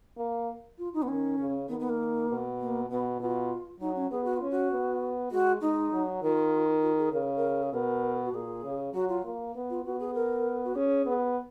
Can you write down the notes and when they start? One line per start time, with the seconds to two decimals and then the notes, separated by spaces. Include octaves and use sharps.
0.18 A#3
0.78 F4
0.94 D#4
1.03 B3
1.08 D#3 C#4
1.39 C#3
1.69 D#3 B3
1.80 B3
1.89 A#3
2.29 B2
2.60 A#3
2.90 B2 B3
3.20 B2 F4
3.80 F#3 D#4
3.95 C#4
4.11 B3 G#4
4.24 F#4
4.37 C#4 F4
4.50 F#4
4.71 B3
5.31 G#3 F#4
5.61 G#3 D#4
5.92 F#3
6.22 D#3 F4
6.82 F4
6.98 G#4
7.12 C#3 A#4
7.23 G#4
7.36 A#4
7.63 G#4
7.73 B2 A#4
8.25 F#4
8.33 A#2 G#4
8.64 C#3
8.94 F#3 F#4
9.09 F4
9.24 A#3
9.55 B3
9.70 F4
9.85 B3 F#4
10.00 G#4
10.14 A#4
10.65 F#4
10.75 C#4 G#4
11.06 B3